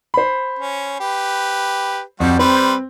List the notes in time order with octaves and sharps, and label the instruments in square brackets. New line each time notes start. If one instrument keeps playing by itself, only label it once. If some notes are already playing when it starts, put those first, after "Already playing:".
[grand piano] C5 B5
[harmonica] C#4
G4 B4
[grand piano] F2 G6 [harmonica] G3 F#4
[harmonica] G3 B4 C5 [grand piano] C4